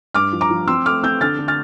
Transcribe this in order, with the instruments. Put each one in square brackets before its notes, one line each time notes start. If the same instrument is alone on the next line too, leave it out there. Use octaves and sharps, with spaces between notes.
[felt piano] G2 D6 F6
F3
A#5 D6
F3
C4 C6 E6
A3 D6 F6
C4 E6 G6
D3 F6 A6
D3
F6 A6